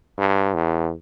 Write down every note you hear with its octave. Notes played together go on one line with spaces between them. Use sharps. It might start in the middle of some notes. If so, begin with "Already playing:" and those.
G2
E2